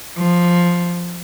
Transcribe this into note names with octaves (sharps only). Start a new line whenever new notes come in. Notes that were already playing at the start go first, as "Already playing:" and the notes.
F3